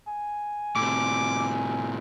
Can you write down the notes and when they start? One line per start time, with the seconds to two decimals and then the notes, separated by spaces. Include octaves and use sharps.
0.08 G#5
0.76 A2 C3 D6